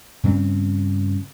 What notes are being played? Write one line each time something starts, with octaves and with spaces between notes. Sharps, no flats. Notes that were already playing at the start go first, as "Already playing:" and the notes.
G2 C#3 C4